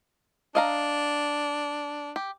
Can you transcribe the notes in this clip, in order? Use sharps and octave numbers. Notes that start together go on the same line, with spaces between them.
D4 D#5 F5 A#5
G4